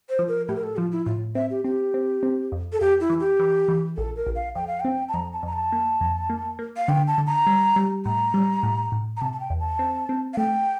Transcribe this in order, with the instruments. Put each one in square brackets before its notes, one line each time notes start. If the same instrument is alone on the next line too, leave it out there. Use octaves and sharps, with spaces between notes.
[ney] C5
[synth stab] F3
[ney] A#4
[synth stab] A2 [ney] G4
[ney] A#4
A4
[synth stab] F3 [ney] F4
[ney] E4
[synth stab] A2 [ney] F4
[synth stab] C4 [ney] E5
[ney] G4
[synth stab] C4 [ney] G4
[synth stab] C4
C4
F2
[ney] A4
[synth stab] F2 [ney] G4
[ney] E4
[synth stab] E3
[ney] G4
[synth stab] E3
E3
[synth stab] A#1 [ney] A4
[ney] A#4
[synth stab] A#1
[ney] F5
[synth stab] F2 [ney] G5
[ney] F5
[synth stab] C4 [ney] G5
[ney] A5
[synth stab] F2 [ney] A#5
[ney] A5
[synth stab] F2 [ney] A#5
[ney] A5
[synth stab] A#3
F2
A#3
A#3
[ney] F5
[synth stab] D3 [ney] G5
[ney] A5
[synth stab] D3
[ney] A#5
[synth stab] G3
G3
[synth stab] A2 [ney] A#5
[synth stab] G3
A2
A2
[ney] A#5
[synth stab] C3 [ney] A5
[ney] A5
G5
[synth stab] E2
[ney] A5
[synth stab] C4
C4
[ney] F5
[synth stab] A3 [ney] G5